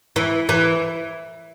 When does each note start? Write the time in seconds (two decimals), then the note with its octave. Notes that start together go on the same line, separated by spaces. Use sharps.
0.16 E3
0.49 E3